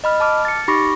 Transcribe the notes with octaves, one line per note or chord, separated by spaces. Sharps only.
D#5 B5 F6
A5 D6 F6
A6 C#7
D#4 G4 B5 C#6 D6 A#6